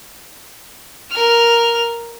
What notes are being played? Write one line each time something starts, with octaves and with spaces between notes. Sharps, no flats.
A#4 F6